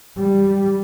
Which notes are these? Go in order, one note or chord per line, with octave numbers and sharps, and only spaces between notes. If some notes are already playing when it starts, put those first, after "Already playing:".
G3